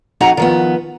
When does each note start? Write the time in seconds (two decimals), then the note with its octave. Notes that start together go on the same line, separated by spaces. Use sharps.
0.21 F2 D#4 F#4 G#4 F#5 A#5
0.37 D#3 F3 B3